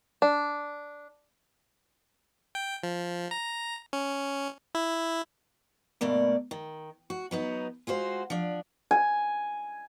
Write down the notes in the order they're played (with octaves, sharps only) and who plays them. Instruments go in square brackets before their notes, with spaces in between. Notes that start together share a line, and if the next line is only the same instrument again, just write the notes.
[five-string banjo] D4
[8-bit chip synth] G5
F3
A#5
C#4
E4
[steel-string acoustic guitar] G2 B2 A3 A#3 D5
D#3
F#4
F#3 B3 D#4
G#3 F4 F#4 C5
F3 D4
[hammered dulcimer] G#5